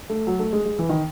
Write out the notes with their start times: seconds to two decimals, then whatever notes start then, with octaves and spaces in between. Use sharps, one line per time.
0.10 A3
0.27 F#3
0.39 A3
0.53 G#3
0.65 G#3
0.79 E3
0.89 D#3